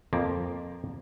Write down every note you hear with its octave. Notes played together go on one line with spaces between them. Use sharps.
F2 F3 A#3